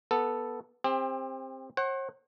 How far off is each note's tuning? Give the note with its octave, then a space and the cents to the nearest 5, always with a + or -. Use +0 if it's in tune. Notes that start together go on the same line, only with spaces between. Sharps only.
B3 -15 A4 +0
C4 +15 G4 +40
C5 +45 F#5 +25